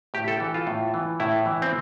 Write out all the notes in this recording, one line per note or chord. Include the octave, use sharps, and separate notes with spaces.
A2 G4
A4
E3
F4
A2
E3
A2 E4
E3
C4